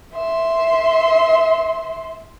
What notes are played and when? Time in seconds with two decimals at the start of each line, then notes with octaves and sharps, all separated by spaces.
0.14 E5 C6